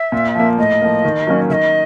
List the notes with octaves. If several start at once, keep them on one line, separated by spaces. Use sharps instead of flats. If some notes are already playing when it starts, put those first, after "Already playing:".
Already playing: E5
A#2
F3 A#3
A2 D#5
F3 A#3
D#3
F#3 A#3 C#4
D#3 D#5 E5